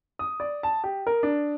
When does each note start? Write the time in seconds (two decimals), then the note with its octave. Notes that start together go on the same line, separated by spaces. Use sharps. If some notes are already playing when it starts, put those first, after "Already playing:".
0.19 D#6
0.40 D5
0.63 A5
0.84 G4
1.07 A#4
1.23 D4